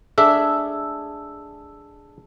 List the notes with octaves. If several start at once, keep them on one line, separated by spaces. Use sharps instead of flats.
D4 G#4 A4 E5 E6